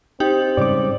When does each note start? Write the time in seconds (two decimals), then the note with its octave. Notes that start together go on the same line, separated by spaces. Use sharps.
0.20 C4 D#4 G4 F#7
0.57 G#2 C#3 G3 D5 D6